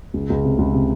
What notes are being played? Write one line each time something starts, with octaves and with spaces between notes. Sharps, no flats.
C#2
C#2
C3
C#2
C3